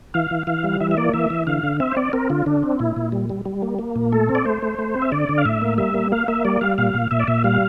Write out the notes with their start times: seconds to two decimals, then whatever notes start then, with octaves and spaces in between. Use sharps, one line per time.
0.14 E3 F5
0.31 E3
0.47 E3 F5
0.64 G3
0.80 E3 E5
0.91 E5
0.97 A#3 D5
1.13 E3 E5
1.30 E3
1.47 D3 F5
1.63 D3
1.80 C4 E5
1.92 C5
1.96 C4 D5
2.13 C4 A#4
2.30 D3 F4
2.46 D3 D4
2.63 C4
2.79 A#2 E4
2.96 A#2
3.12 G3
3.30 G3
3.45 G3
3.62 A#3
3.79 A#3
3.96 A#2
4.12 A3 A4
4.29 C4
4.35 D5
4.45 A3 C5
4.62 A3
4.78 A3
4.95 C4
5.02 E5
5.12 D3 D5
5.29 D3
5.38 F5
5.45 A2 E5
5.62 A#3
5.78 G3 E5
5.94 A#3
6.12 A#3 F5
6.28 A#3 E5
6.45 G3 D5
6.61 G3 F5
6.78 A#2 F5
6.95 A#2
7.11 A#2 E5
7.20 D5
7.27 A#2 E5
7.44 G3 F5